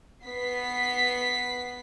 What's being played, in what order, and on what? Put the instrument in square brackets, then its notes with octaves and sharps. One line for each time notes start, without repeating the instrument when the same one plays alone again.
[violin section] B3 B6 C7